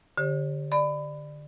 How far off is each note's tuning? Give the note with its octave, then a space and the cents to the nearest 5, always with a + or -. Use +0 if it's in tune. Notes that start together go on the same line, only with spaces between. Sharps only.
D3 +0 G4 +0 C5 +45
D5 +20 B5 +25